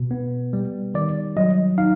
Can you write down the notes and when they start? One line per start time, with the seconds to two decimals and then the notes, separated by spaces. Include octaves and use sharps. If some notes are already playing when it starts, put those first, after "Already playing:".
Already playing: B2
0.11 B3
0.53 G3
0.94 D#3 D5
1.37 F#3 D#5
1.78 D#4 F5